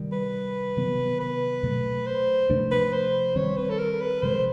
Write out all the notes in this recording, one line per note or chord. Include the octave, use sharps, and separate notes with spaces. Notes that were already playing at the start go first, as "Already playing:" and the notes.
Already playing: C3 D#3 G3
B4
C3 D#3 F#3 B3
B4
B2 F#3 A3
C5
C3 F3 A3 D4
B4
C5
D#3 G3 C4 C#5
B4
A4
A#4
B4
C3 F3 G#3 C5